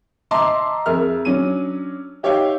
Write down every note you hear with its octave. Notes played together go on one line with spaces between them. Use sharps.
D#5 E5 A5 A#5 C6 D6
F2 G#4 A#4 E5 F6
F#3 C#4 D4 D#7
D#4 G4 C#5 E5 F5 G5